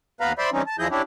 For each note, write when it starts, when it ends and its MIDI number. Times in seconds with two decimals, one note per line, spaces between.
0.21 0.33 39
0.21 0.33 59
0.21 0.33 71
0.21 0.33 77
0.21 0.33 82
0.21 0.33 83
0.38 0.50 72
0.38 0.50 74
0.38 0.50 76
0.38 0.50 83
0.38 0.50 84
0.53 0.62 52
0.53 0.62 55
0.53 0.62 60
0.53 0.62 61
0.53 0.62 63
0.67 0.76 81
0.79 0.88 40
0.79 0.88 53
0.79 0.88 64
0.79 0.88 68
0.79 0.88 75
0.79 0.88 91
0.91 1.02 61
0.91 1.02 62
0.91 1.02 64
0.91 1.02 67